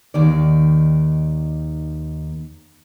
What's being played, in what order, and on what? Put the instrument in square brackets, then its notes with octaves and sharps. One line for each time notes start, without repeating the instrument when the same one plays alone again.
[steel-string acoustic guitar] D#2 D#3 D5